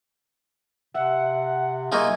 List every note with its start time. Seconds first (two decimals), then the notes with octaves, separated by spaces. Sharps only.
0.94 C3 E5 F#5
1.92 A#3 D#4 F4 G#4 E5 G#5 C#6 G#6